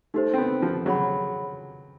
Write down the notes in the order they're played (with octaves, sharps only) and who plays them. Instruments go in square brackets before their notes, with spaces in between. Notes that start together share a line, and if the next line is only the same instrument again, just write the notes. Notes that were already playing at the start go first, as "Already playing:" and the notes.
[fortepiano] A3 [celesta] D#4 G4 C5
[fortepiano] C4
B3
F3
[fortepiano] F#3 [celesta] G#4 C#5 F#5 B5